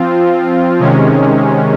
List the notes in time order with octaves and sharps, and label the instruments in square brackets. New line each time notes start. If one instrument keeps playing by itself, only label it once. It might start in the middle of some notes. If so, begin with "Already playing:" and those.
Already playing: [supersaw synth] F3 C4 F4
C3 D#3 G#3 C#4